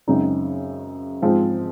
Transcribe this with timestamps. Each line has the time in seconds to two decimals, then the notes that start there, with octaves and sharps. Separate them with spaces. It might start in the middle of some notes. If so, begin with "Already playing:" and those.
0.07 F#2 C#3 G#3 C4 D#4
1.22 G#2 F3 G#3 C4